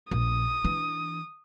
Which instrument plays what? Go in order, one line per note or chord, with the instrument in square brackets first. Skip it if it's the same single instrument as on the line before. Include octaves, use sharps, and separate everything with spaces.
[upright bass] A#1 [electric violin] D#6
[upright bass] E3 D4